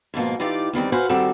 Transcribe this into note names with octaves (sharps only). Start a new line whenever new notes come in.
G#2 B2 F3 A#3
E3 D#4 F4 G4 D5
E2 D#3 G3 C4
F#4 B4 C5 F5 G#5
D#3 G3 C4 F#4 A4